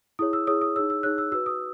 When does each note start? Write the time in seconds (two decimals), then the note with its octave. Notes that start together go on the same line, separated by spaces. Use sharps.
0.19 E4 G#4 C#5 D#6
0.33 E6
0.47 E4 G#4 C#5 D#6
0.61 D#6
0.76 D#4 G#4 C#5 E6
0.90 E6
1.03 D#4 G#4 C#5 F#6
1.18 E6
1.32 F#4 B4 E6
1.46 D#6